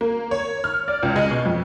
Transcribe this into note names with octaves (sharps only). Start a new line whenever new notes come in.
A#3
C#5
F6
D5
C#2
G#3
B2
F2